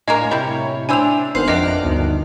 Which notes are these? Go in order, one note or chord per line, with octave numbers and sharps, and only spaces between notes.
A2 G#3 A#3 D4 A#4 C#5 D#5
A2 C3 G3 E4
D4 E4 G4 C5 G#5 E6 F7
G#1 D#3 B3 C5 F5 F#6 C7
F2 C3 D4 G4 D#5 F#5 D6 F6
G1 D2 D#3